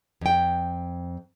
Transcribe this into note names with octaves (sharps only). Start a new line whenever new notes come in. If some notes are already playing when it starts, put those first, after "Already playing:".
F2 G5